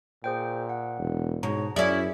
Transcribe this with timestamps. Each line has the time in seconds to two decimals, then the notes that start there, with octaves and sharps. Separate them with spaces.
0.24 A#2 G#4 C5 G5
0.69 F#5
0.99 E1
1.43 G#2 B2 C#5 A#5
1.76 F#2 C#4 E4 G#4 D5 E5